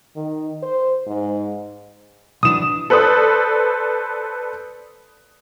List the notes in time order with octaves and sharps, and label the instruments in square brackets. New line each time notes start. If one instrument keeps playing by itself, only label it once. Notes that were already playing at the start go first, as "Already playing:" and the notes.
[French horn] D#3
C5
G#2
[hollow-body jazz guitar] B1 E3 D4 [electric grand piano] D#6 E7
[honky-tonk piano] A4 B4 C5 D5 D#6